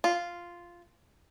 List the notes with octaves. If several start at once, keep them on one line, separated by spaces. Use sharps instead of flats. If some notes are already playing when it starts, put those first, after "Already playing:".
F4